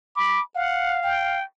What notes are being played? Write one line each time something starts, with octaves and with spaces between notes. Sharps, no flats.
B5 D6
F5 F#5
G5